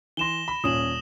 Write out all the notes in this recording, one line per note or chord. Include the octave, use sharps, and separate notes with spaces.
E3 C6 A#6 E7 G7
B5
D#1 A#2 C#4 D#6 E7 F#7